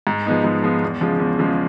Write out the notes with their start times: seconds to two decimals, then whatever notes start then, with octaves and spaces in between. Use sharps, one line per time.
0.07 G#2
0.26 F3 G#3 B3 D#4
0.44 G#2
0.64 F3 G#3 B3 D#4
0.83 E2
1.01 C#3 F3 G#3
1.20 E2
1.39 C#3 F3 G#3